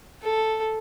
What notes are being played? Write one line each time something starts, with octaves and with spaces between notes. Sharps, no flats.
A4